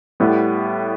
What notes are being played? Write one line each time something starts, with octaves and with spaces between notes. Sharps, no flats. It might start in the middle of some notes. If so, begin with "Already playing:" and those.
A2 G3 B3